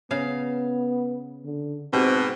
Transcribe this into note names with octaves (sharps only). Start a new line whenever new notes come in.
C#3 B3 F5
D3
G#2 B2 C4 G4